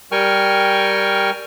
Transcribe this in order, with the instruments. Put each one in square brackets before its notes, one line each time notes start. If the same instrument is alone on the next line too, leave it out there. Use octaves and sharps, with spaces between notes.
[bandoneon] G3 A#4 G5 G#5 C#6 F6